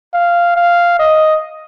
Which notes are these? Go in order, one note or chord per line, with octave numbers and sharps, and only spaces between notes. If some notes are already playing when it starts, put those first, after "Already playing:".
F5
F5
D#5